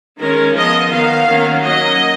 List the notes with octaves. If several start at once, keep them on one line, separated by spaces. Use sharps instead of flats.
D#3 G#3 C#4 A#4
F3 B3 D#5
D#3 F#3 B3 F5
D#3 F#3 A#3 C#4
F#3 A#3 C#4 D#5